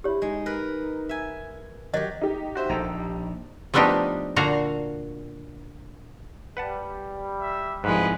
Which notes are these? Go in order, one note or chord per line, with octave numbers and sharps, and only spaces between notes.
E4 G4 C#5
G#3 D#4
A#4 B4
E5 G#5
D#3 F#3 G4 D#5
D#4 G4
F#4 C5 E5
A#1 A4 G5 A#5
F3 A3 B3 D4 D#4 G4
A#2 D3 F#4 F5 A#5
G3 B4 F#5 A5
E5
C2 G#2 F3 G#3 B4